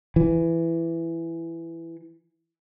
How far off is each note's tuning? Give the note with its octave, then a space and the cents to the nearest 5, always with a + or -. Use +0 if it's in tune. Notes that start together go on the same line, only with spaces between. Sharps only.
E3 +10